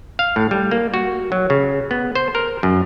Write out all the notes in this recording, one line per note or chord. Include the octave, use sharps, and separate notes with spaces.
F5
A2
G3
A#3
F#4
F#3
C#3
B3
C5
A#4
F#2